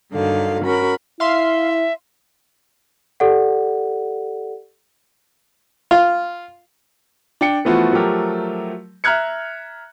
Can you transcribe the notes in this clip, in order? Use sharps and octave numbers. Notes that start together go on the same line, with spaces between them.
G2 D3 D#3 F#3 F5
C#4 F#4 A#4 B5
E4 E5 F5 C6
G4 A4 D5 F#5
F4
D4 G5 C#7
E3 F3 A3 B3 F4 F#4
F3 F#3 A3 G4 A#4
E5 A#5 F6 F#6 G#6 C#7